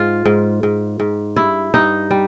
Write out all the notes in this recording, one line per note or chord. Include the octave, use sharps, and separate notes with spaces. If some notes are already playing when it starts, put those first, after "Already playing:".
Already playing: G#2 F4
G#2
G#2
G#2
G2 E4
G2 D#4
G3